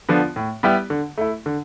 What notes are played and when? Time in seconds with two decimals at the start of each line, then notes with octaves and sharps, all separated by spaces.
0.09 D3 F3 B3 D4
0.36 A2
0.63 G3 B3 E4 G4
0.90 D3
1.18 A3 E4
1.46 D3